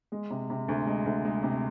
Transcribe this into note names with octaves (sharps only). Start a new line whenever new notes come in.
G#3
C3
C3
D2
G#3
D2
G#3
C3